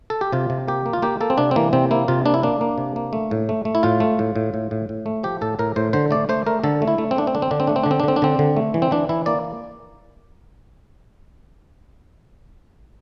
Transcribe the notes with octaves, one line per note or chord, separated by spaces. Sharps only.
A4
G4
C3 F4
C3
A#3 G4
A#3
F4
A#3 G4
A#3 A4
C4
C3 D4
C4
E3 A#3
C3 C4
A#3 E4
C3 F4
A#3 D4
E4
A#3 D4
A#3
C3
A#3
A3
A2
A3
A3
E4
A2 F4
A3
A2
A2
A2
A2
A2
A3
F3 G4
A2 A4
A2 A#4
A2 C5
D3 C5
A3 D5
A3 C5
A3 A#4
D3 A4
A3
E4
A3
C4
A3 D4
C4
D3 D4
C4
D3 D4
C4
A3 D4
C4
D3 D4
C4
D4
D3 C4
D4
D3 C4
D3
A3
E3
C4
E3 D4
E3 E4
A#3 D5